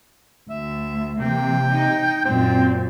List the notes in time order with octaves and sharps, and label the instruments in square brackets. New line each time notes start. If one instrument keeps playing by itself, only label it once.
[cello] D2 [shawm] E5
[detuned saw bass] C3 [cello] E3 A#3 [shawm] G5
[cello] D#4 D#5
[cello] F#2 A#2 [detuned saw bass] C4 [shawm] G5